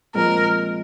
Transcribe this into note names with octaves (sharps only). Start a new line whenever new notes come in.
A#2 F3 G#3 C4 A#4